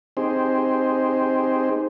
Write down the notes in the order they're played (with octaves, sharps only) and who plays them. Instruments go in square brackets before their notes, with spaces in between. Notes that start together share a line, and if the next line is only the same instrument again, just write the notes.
[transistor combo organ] C4 D#4 G4 G#4 C5